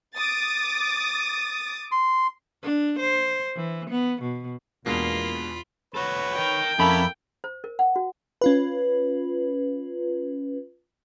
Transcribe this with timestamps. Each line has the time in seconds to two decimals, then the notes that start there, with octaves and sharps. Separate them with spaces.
0.15 D6 D#6 A6
1.92 C6
2.63 D4
2.99 C5
3.56 E3
3.90 B3
4.22 B2
4.86 E2 B2 G#3 A#3 D4 F4 B5
5.94 F#4 A4 B4 C#5
6.36 A#4 D#5 G5
6.79 F2 A#3 C#4 E4 A4 B5
7.44 C5
7.64 A#4
7.79 F#5
7.96 F#4
8.41 C#4 F4 B4